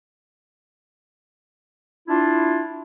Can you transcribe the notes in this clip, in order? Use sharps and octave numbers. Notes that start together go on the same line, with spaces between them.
D4 E4 F4